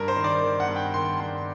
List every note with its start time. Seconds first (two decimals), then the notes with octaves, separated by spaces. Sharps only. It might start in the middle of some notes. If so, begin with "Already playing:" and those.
Already playing: G2 A#4
0.08 C5
0.16 D#3
0.24 D5
0.42 D#3
0.60 F#5
0.68 G2
0.76 G5
0.94 D#3 C6
1.19 G2 C6